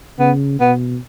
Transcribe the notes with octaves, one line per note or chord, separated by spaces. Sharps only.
C#3 B3
B2 B3